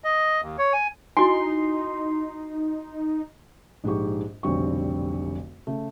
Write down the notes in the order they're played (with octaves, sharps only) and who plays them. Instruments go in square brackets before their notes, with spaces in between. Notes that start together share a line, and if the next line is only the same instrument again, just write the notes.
[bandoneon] D#5
D#2
C#5
G#5
[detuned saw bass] D#4 [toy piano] E4 F#4 G#5 [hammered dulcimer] C6
[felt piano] A#1 G#2 G#3 G4 C#6
F1 B1 D3 G3 C4 C#6
C#3 A3